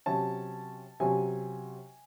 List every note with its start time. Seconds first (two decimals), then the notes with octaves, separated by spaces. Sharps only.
0.06 C3 F#3 C#4 A5
1.00 C3 F#3 C#4 G#5